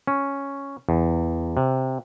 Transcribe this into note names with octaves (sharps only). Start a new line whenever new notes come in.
C#4
E2
C3